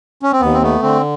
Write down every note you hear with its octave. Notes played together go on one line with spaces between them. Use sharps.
C#4
C4
D#2 B3
C4
A3 B3
D3 C4